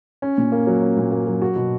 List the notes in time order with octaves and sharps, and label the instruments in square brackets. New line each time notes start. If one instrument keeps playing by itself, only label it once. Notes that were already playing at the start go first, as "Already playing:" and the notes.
[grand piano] C#4
A#2
A#3
F#3
C#4
A#2
A#3
F#3
F#4
B2